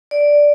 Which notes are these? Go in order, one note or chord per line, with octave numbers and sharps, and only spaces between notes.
D5